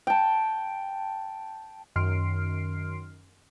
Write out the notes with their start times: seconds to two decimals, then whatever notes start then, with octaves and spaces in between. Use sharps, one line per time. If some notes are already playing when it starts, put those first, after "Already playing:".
0.07 G5 A5
1.96 F#2 D#3 C6 F6 C7 D7